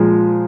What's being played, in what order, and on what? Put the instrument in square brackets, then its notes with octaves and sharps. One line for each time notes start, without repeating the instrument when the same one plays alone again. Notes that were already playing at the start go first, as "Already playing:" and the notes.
Already playing: [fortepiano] A#2 F3 G#3